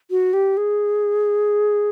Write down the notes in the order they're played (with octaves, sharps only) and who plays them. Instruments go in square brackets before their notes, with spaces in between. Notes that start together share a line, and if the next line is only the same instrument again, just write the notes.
[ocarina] F#4
G4
G#4